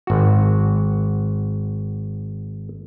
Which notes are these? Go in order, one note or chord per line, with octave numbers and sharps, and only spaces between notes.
G#1 F#4